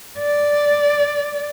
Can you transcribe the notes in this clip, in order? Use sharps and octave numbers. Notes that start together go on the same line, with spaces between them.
D5